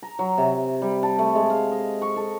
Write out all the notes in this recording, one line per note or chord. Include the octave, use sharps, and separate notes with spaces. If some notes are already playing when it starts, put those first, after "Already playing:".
A#5
F#3
C3
G3
A5
A3
G#3
F5
D#5
C#6
A4